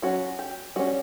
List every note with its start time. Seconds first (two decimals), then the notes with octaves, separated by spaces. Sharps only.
0.02 F#3 C#4 F#4
0.39 G4
0.76 G3 C#4 F#4